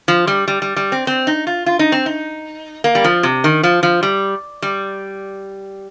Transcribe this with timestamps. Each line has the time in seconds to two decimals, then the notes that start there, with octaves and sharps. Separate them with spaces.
0.08 F3
0.27 G3
0.48 G3
0.62 G3
0.76 G3
0.92 C4
1.07 C4
1.27 D#4
1.47 F4
1.66 F4
1.79 D#4
1.92 C4
2.06 D#4
2.84 A#3
2.95 G3
3.04 F3
3.23 C3
3.44 D#3
3.63 F3
3.83 F3
4.03 G3
4.62 G3